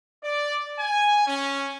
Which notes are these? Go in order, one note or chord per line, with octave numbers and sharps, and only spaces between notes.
D5
G#5
C#4